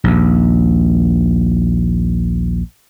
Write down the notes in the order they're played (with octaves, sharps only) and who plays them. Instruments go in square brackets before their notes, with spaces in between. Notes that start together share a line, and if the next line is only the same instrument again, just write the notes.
[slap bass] A#1 D#2